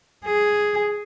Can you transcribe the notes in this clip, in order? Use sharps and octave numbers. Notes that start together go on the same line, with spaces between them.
G#4